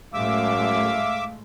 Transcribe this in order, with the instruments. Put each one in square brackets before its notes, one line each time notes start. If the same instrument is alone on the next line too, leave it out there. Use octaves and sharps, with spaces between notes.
[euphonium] F#2 [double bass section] A2 G#3 A3 [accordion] E5 D6 E6 [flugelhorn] F5